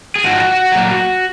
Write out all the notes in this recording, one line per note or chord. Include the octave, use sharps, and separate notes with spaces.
G#4
G#2 F3 F#4
A#2 F#3